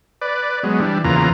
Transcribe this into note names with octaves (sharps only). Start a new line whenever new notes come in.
B4 D5
F#3 G#3 B3
E3 G3 D4
E2 C#3 E3 A#3 F4 A#5